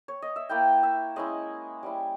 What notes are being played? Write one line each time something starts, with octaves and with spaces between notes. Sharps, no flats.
C#5
D#5
E5
A#3 E4 G5
E5
G#3 C#4 E4 D#5
G3 C#4 E4